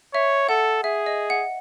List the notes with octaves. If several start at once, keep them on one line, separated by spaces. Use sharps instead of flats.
C#5 E5
A4 F#5
G#4 E5
D#5
F#5